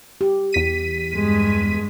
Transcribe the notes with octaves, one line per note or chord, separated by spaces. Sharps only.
G4
E2 B6 D#7
G2 G#3